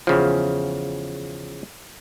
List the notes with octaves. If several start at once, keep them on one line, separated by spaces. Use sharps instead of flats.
E2 C#3 F3